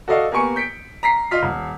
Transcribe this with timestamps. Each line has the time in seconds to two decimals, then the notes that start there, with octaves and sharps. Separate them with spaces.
0.08 F#4 A4 D5 D#5 F5
0.31 A#3 B3 G4 G#5 C#6 C#7
0.56 G6 B6 C#7 D7
1.03 A#5 B6 C7
1.31 F4 D#5 F6 B6
1.43 D#1